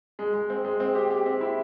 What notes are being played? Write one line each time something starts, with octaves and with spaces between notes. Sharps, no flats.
G#3
G#3
C4
G#3
C4
G4
G4
C4
E4